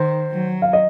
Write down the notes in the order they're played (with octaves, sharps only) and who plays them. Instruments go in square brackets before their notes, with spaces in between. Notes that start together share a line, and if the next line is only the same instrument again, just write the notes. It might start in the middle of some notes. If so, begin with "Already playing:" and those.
Already playing: [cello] D#3 [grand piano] C5
[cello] F#3
[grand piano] F5
D#5